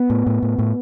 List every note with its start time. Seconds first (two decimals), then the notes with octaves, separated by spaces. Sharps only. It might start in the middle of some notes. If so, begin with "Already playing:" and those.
Already playing: B3
0.10 A2
0.27 A2
0.42 A2
0.59 A2